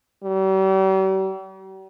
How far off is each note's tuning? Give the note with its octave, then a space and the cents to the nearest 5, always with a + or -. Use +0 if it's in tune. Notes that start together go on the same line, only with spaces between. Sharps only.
G3 -45